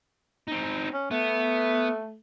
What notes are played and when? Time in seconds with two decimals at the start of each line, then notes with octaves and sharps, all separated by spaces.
0.48 C4 D#4
0.94 C#4
1.11 A3 B3